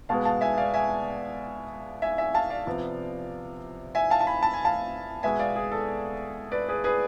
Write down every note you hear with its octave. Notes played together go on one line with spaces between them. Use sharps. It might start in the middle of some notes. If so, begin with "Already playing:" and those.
B2 G#3 B3 F5 A5
F5 A5
E5 G#5
D5 F5
E5 G#5
E5 G#5
E5 G#5
F5 A5
D5 F5
C3 F3 B3
E5 G#5
F5 A5
A5
G#5 B5
A5
G#5
F5 A5
B2 G#3 B3 E5 G#5
D5 F5
G#4
A4
B4 D5
G#4 B4
G#4 B4